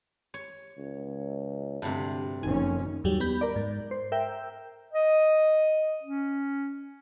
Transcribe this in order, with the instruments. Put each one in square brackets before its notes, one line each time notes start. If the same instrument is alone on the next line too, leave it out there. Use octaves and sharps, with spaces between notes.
[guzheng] C#5
[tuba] C#2
[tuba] D2 [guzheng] G2 C3
[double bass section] F#1 F2 C#4 [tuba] D#3 [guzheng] G#5
[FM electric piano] D#2 G#2 F#3 G3
B3 B5 G6
A#4 D5
G#2
C5
A#4 E5 G5
[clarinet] D#5
C#4